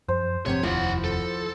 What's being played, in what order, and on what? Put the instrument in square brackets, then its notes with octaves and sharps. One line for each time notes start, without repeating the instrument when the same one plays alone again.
[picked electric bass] F#2 F3 [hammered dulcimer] C5
[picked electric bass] G#1 F3 D4 [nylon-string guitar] C3 B3 [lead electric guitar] C#5
[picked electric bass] F1 D#2 C3 [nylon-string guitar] F3 B3 E4 [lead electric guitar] F4 F#5
[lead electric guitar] A4